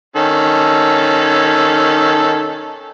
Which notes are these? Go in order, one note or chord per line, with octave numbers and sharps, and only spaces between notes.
D#3 C#4 A4